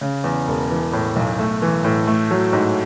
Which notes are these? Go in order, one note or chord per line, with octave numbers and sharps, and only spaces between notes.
C#3
E2
E1
E3
A2
B1
A3
E3
A2
A3
F#3
G#2